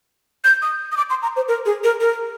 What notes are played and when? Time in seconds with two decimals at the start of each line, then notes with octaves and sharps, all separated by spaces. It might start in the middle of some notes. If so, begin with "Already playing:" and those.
0.44 G6
0.62 D#6
0.92 D#6
0.97 D6
1.10 C6
1.22 A#5
1.36 C5
1.48 A#4
1.66 G#4
1.84 A#4
2.01 A#4